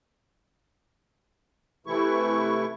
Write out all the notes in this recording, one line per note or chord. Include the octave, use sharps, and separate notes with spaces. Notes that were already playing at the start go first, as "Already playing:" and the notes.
C3 E3 A3 E4 C#6